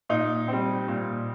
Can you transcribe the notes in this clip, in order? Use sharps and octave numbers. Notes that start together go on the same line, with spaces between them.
A#2 D#4
G3 C4
A#2